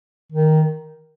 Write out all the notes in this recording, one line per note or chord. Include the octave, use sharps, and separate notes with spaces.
D#3